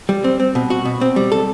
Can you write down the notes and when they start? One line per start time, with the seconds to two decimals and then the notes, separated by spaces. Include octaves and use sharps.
0.09 G3
0.24 C4
0.40 C4
0.55 B2
0.70 F#4
0.85 B2
1.01 C4
1.16 G3
1.32 A4